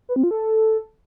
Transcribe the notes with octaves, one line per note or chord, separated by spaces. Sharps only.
B4
C4
F4
A4